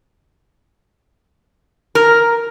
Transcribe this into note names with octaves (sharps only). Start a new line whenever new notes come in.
A#4